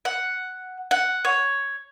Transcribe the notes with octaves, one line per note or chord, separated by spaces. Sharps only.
F#5
F#5
C#5